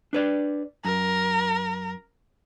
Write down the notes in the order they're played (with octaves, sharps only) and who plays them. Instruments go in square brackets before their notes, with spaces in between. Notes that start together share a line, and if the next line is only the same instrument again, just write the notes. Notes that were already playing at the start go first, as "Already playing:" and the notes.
[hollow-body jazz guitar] D4 B4 D5
[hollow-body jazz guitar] F#2 [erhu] A#4